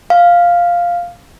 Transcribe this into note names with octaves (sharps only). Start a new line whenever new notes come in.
F5